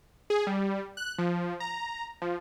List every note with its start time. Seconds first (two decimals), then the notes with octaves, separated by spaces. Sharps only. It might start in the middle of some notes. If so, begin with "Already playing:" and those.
0.30 G#4
0.47 G3
0.97 F#6
1.18 F3
1.60 A#5
2.22 F3